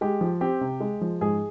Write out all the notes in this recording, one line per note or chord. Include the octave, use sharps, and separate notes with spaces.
G#3 G4
F3
C4 G4
C3
G#3
F3
G#2 G#4